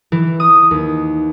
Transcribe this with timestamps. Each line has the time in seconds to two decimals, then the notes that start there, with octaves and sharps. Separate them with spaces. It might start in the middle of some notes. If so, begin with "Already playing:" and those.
0.12 E3
0.40 D#6
0.71 D#2